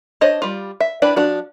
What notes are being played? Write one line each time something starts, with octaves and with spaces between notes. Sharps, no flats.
D4 C5 C#5 D#5
G3 F4
E5
D4 E4 B4 D5 G5
F3 D4 F#4